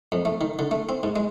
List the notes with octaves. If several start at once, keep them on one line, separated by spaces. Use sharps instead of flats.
F2
A3
D#3
D3
A3
C4
G#2
G#3